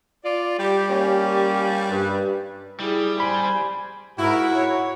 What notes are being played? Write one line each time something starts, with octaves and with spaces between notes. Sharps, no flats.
F4 D5
G3 G4
A#3 C#4 G4
G2 B4
G3 E4 G#4
C5 G#5 B5
G#2 E4 F#4 A#4
C#5